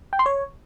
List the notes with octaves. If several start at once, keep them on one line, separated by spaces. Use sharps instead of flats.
G5
C6
C#5